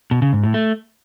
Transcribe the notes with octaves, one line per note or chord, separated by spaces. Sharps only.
B2
C#3
G#2
A2
A3